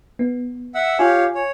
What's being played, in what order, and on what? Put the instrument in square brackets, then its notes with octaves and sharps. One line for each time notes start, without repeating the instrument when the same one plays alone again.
[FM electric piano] B3
[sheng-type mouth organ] E5 F#5 E6
[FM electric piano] F4 G#5 [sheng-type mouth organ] G4 C#5 F5
[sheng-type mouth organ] C#5